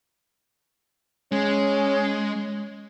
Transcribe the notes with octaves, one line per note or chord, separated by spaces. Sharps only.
G#3 C#4